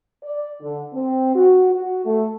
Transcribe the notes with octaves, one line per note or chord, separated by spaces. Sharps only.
D5
D3
C4
F#4
F#4
A3